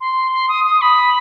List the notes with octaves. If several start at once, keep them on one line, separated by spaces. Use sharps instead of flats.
C6
C6
D#6
D#6
B5